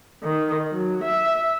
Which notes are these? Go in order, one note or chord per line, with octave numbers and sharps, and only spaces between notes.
D#3
F#3
E5